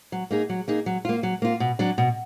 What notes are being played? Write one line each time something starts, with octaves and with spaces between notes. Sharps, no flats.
F#3
A#3 D#4 G#4
F#3
A#3 D#4 G#4
F#3
A#3 F4
F#3
A#3 F4
B2
F#3 D4
B2